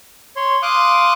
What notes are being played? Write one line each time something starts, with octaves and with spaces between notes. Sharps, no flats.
C#5 C6
F5 C6 D6 D#6 F#6